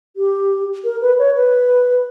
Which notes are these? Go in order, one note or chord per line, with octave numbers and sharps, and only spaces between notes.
G4
A#4
B4
C#5
B4